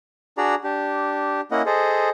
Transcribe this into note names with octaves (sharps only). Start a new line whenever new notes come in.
D4 F#4 G#4 D5 A#5
D4 G4
A#3 C#4 E4 D#5 F#5
G#4 A4 C5 D#5